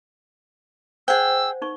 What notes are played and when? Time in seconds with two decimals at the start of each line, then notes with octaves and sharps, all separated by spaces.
1.08 G#4 C5 F#5 G5 E6
1.62 D#4 C#6